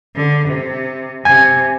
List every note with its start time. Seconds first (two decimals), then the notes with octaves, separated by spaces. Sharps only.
0.16 D3
0.48 C3
1.25 C3 G#5 G#6